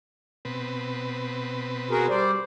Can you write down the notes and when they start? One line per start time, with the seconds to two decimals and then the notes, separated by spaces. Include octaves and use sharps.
0.45 B2 C4 B4
1.91 F#4 G#4 A#4
2.10 G3 C5 D5